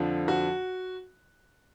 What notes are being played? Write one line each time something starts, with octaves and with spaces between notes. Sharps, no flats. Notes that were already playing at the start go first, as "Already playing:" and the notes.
Already playing: F2 D3 F3
F#4